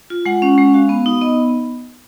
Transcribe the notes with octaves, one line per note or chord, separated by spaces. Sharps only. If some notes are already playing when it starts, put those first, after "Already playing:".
F4
G#3 F#5
C#4
G#3
F#4 F5
B3
D#4
B3 D#5